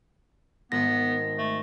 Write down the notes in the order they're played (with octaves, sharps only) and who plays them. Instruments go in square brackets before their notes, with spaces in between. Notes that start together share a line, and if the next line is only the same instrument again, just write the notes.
[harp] G#1 [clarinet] B3 [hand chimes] A#6
[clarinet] A3